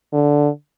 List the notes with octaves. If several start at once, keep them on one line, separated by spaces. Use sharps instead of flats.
D3